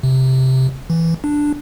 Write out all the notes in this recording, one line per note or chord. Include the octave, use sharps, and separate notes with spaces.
C3
E3
D4